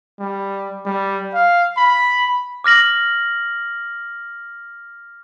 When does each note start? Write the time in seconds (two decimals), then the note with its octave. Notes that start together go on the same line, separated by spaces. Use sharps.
0.20 G3
0.86 G3
1.34 F5
1.77 B5
2.64 D6 F6 A#6 F#7